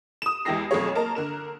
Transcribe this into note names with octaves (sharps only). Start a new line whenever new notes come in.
D#6 E7
E2 G#3 E4 G4 A#6 C7
B1 F2 A3 G#4 C#5
A#3 A#4 D#5 A5 A#5
D3 A#4 E7